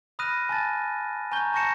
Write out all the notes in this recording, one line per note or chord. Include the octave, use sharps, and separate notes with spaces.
B5 D#6 F6 F#6 A#6 D#7
G#5 A5 A6
G#5 A#5 C#6 G6 G7
A5 C#6 G6 A#6 C#7 E7